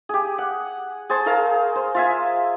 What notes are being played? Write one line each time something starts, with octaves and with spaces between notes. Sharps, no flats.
G4 G#4
F#5
G#4 C5 A5 C#6
G#4 A#4 F5 A#5
C5
F4 E5 G#5